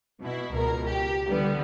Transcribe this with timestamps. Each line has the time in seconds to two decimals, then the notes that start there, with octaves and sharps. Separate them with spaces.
0.21 B2 E4
0.52 C#2 B2 A#4
0.88 G4
1.28 D3 E3 G3 B3